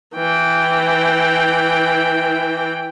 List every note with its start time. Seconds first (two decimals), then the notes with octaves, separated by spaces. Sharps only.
0.15 E3 G5